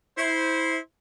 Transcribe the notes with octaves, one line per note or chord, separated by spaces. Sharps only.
E4 C5